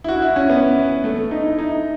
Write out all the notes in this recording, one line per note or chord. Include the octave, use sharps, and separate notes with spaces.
E4
F#4
E4
C#4
B3
A3
A3
D#4
E4
D#4